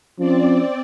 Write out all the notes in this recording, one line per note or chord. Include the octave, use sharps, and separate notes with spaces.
F3 C4 C#4 D5